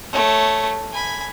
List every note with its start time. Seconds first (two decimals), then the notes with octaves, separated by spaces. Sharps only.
0.13 A3 C#5
0.92 G#5 B5